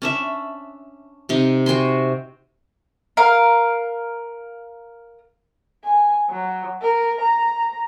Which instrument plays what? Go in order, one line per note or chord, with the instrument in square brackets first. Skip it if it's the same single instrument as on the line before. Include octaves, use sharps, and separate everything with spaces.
[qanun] C#4 D4 E5
C3 D#4
F#4 G5 G#5 C6
[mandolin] A#4 F5
[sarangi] G#5
F#3
A#4
A#5